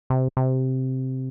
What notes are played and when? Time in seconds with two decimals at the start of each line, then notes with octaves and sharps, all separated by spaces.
0.10 C3
0.37 C3